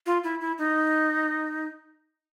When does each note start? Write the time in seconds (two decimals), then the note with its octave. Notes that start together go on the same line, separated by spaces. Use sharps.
0.06 F4
0.24 E4
0.40 E4
0.58 D#4